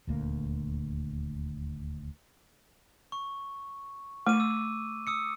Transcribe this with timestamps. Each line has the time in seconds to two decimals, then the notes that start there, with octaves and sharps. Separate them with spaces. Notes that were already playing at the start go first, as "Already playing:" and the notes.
0.07 D#1 D2 A#3
3.12 C#6
4.27 A3 D6 D#7
4.40 E6
5.07 D#6 E6 C#7